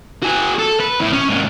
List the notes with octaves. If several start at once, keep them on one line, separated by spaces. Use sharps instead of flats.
F#4 G#4
A4
B4
A2
C#4
G#2 A#3